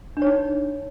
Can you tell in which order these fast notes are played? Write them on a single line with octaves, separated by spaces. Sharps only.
D4 C#5 D#4